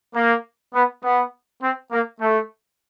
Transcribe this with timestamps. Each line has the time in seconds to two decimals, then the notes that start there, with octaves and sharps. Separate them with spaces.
0.15 A#3
0.74 B3
1.03 B3
1.62 C4
1.92 A#3
2.21 A3